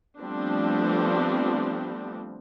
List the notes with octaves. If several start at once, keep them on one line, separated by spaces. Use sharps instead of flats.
F3 G3 A3 B3 C4 D4